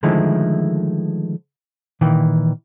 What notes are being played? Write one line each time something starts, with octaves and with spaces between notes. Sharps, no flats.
D3 D#3 F3 G#3 A3 E4
A#2 D#3 E3